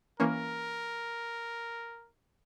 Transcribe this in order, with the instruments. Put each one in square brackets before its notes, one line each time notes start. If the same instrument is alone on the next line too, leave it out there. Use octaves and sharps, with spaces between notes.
[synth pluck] E3 A#3 C#4 [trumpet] A#4